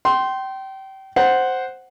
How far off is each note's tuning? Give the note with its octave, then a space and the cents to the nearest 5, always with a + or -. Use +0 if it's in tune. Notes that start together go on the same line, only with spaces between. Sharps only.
G5 -30 C6 +0
C5 +0 F#5 +5